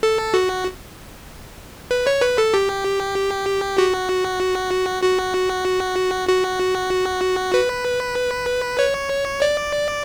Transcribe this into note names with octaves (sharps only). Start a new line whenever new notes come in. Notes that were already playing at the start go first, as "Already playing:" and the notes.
A4
F#4
B4
C#5
B4
A4
G4
F#4
F#4
F#4
B4
C#5
D5